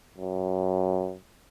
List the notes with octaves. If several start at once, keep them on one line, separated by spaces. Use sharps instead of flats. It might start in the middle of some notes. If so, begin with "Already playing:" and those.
F#2